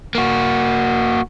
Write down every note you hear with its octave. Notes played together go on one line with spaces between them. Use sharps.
A#3 F#4